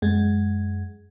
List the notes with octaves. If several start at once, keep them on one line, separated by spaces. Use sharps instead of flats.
F#2 G#3